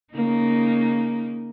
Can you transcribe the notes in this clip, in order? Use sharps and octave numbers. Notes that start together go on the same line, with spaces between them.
C#3 A#3 D#4